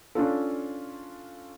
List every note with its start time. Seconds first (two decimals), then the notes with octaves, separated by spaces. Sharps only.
0.15 C#4 D4 F4 A4